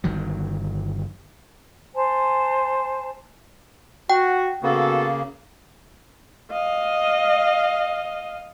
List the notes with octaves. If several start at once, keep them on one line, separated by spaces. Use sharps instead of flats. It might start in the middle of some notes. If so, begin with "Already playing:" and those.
G1 D#3 F#3
C5 G#5 A5
F#4 G5
C#3 A#3 B3 F#4 A4
D#5 F5